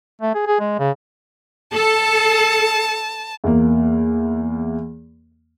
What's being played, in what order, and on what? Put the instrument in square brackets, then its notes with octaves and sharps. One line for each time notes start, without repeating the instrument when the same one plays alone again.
[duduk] A3
G#4
G#4
G#3
C#3
[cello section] A4 [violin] A5
[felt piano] E2 A#3